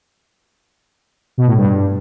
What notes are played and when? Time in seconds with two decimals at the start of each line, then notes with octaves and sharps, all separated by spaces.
1.38 B2
1.47 A2
1.56 G2